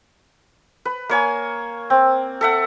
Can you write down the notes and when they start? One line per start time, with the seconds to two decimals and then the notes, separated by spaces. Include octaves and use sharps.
0.85 B4
1.09 A#3 C#5 G#5
1.90 C4
2.41 A4 E5 F#5